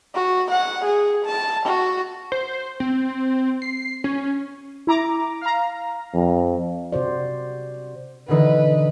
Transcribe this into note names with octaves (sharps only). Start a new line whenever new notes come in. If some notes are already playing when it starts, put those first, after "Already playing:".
F#4
F#5
G#4
A5
F#4
C5
C4
C7
C#4
E4 A#5 D6
F5 A#5
F2
C3 F#4 C5 D5
B2 D3 E3 D#4 B4 F#5